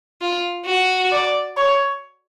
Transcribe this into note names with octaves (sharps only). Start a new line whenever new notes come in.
F4
F#4
D5
C#5